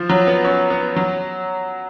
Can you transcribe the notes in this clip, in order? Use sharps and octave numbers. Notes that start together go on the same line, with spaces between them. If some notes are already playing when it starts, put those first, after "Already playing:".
Already playing: F3
F#3
B3
C#4
B3
F#3